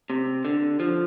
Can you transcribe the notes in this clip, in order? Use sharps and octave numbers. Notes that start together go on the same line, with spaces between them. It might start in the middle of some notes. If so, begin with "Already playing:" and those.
C3
D3
F3